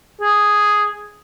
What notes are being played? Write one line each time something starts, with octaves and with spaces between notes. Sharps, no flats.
G#4